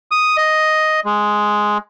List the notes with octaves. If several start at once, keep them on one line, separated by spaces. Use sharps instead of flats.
D#6
D#5
G#3